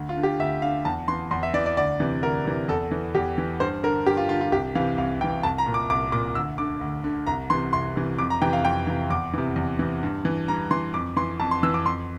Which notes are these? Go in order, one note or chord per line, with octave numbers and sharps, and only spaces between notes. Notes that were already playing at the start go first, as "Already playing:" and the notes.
Already playing: D2
F4
D3
G4
D2 E5
D3 F5
E2 A5
E3 C6
E2 C6
E5
E3 D5
D5
D2 D5
C3 E3
D2 A#4
C3 E3
E2 A4
E3
E2 G4
E3
G2 C5
D3 A#4
G2 G4
F4
D3 F4
F4
C2 G4
C3 E3 F5
C2 F5
C3 E3 G5
C2 A5
A#5
A#2
D6
C2 D6
A#2 D6
D2 E6
D3 D6
D2
D3
C2 A#5
C3 E3 C6
C2 C6
C3 E3
F2 D6
A#5
C3 E3 G5
F5
F2 G5
C3 E3
E2 D6
C3 E3
E2
C3 E3
G2
E3
G2 A#5
E3 C6
F2 D6
E3 C6
F2 A5
C6
E3 E6
D6
F2 C6